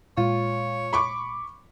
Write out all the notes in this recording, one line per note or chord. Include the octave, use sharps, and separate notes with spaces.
A#2 G#3 F4 C#5
B5 C#6 D6